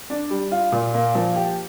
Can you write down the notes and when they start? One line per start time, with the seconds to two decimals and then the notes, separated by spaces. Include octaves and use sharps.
0.10 D4
0.30 G3
0.51 F4
0.72 A#2
0.94 A#3
1.15 F3
1.36 G4